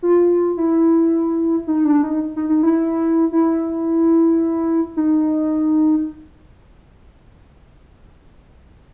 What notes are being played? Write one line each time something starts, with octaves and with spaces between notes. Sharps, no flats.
F4
E4
D#4
D4
D#4
D#4
D#4
E4
E4
D#4